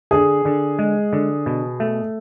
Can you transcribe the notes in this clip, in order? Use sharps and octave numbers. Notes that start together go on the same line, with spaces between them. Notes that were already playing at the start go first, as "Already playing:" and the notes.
D3 G#4
D3
G#3
D3
B2
A3